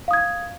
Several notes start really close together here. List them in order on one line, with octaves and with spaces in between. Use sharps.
F5 D#6 G#6